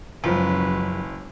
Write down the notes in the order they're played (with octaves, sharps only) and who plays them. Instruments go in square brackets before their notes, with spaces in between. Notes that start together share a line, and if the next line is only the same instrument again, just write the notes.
[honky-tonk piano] F#1 [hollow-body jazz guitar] F#2 F3 F4 [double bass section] F#3 G#3 C#4 [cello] B4